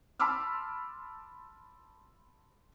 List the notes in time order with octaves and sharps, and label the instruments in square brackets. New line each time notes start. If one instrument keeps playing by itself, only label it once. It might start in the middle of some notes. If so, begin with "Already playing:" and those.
[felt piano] A5 B5 C6 D6 E6 F6